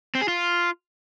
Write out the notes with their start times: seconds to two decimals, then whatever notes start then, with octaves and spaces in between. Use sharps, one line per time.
0.15 C4
0.22 G#4
0.28 F4